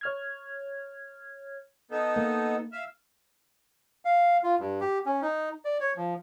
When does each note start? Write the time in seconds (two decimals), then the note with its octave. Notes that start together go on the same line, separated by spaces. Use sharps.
0.01 C#5 F6 G#6
1.91 B3 D#4 A4
2.16 A#3
2.72 E5 F5
4.05 F5
4.43 F4
4.59 G2
4.81 G4
5.06 C#4
5.22 D#4
5.65 D5
5.80 C#5
5.96 F3